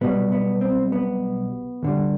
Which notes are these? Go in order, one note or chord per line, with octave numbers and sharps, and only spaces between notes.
B1 B2 G3 B3
B3
C4
B3
D2 D3 G3